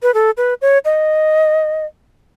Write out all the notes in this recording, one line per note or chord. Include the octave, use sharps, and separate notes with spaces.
B4
A4
B4
C#5
D#5